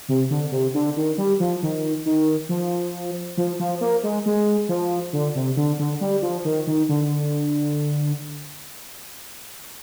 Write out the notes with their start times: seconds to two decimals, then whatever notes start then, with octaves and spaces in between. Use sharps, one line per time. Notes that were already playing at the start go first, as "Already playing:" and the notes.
0.09 C3
0.30 D3
0.52 C3
0.74 D3
0.96 D#3
1.18 G3
1.40 F3
1.63 D#3
2.06 D#3
2.49 F3
3.37 F3
3.59 F3
3.81 A#3
4.03 G#3
4.26 G#3
4.69 F3
5.13 D3
5.35 C3
5.57 D3
5.79 D3
6.01 G3
6.22 F3
6.45 D#3
6.67 D#3
6.89 D3